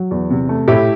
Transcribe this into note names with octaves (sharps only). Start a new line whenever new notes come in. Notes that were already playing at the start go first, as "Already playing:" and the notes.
Already playing: F#3
E2
C3
A3
A2 E4 G4